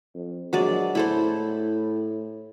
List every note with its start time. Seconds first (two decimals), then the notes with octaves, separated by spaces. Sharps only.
0.14 F2
0.53 A#1 F#3 G#3 D5
0.95 A2 E4 A4 C5